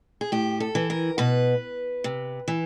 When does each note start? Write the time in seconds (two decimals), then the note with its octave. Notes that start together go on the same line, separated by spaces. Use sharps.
0.21 G#4
0.32 A2 G4
0.60 A4
0.75 E3
0.90 A#4
1.18 B2 B4
2.04 C3
2.48 E3